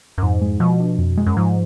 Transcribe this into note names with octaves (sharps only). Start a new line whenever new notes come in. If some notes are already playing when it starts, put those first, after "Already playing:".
F#2
F2 G#2
G#3
B2 F3
D4
F2
G#3
F#2
G#2 F3